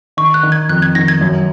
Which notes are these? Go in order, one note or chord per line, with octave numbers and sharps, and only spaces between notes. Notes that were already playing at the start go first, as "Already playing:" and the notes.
D#3 C#6
F#6
D#3
G#6
F2 F#6
G#6
D#3 A#6
G#6
F#2